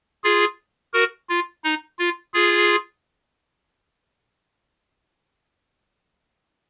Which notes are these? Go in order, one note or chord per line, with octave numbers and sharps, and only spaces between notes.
F4 G#4
F#4 A#4
F4
D#4
F4
F4 G#4